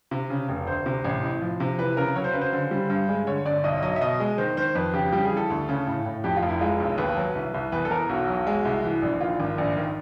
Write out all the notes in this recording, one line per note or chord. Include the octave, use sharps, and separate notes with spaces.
C3
C#3
F1
D2 C5
C3
A1
A2
F3
C3
E3 B4
C#3 A#4
F#3 C#5
C5
C#3 B4
C5
D3
G3
G2
G#3
D3 C#5
G1 D5
B1 D#5
F#3 D#5
E5
B2 D#5
G#3
D#3 C5
D#3 C5
F2 B4
C#3 G4
G3 G4
G#4
E3
A4
D2
C#3
A2
A2
F2 G4
F4
F1
E4
G#3 F4
B1
D#2 B4
F#3
C2
C2
E2 B4
A4
E2 A#4
B1 F#4
F#3
G#3
C2
E3
A#1
D#3 F4
G#1
A#1
D#3